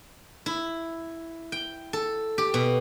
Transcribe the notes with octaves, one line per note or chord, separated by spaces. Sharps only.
E4
G5
A4
G4
B2